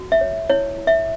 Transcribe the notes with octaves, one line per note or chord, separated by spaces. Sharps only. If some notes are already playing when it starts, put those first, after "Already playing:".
Already playing: F#4
E5
C#5
E4 C#5
E4
E5